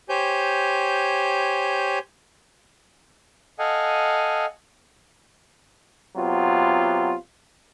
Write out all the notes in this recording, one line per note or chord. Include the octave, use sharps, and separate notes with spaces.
G4 C5 C#5 G#5 G6
A4 D#5 F5 F#5 G#5
C3 F#3 B3 F4